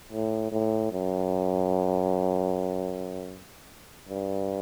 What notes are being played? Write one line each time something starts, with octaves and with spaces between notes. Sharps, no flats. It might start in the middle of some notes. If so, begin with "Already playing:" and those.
A2
A2
F#2
G2